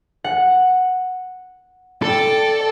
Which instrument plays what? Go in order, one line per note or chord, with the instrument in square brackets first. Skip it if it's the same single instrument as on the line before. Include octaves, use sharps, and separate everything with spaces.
[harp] F#5
[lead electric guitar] A4 [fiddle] D5 G5